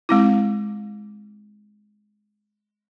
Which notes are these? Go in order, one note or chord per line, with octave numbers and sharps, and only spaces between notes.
G#3 C4 E4